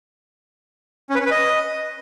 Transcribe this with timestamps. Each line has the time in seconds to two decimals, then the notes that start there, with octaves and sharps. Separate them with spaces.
1.10 C#4
1.15 B4
1.20 C#4
1.26 B4
1.31 D#5